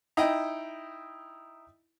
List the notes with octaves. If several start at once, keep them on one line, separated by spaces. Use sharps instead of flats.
D#4 E4 D#5 G5 D#6